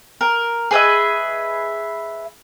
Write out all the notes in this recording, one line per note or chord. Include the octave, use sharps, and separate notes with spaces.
A#4
G#4 B4 D#5 E5